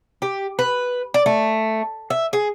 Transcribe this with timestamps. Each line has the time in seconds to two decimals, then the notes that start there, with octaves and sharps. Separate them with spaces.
0.22 G4
0.59 B4
1.14 D5
1.26 A3
2.10 E5
2.33 G#4